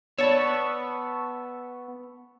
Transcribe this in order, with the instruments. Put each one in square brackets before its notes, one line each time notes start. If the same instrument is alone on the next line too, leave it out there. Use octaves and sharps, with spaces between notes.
[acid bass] B3 [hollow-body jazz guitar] C#5 D5 B5 [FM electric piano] A5 C#6 E6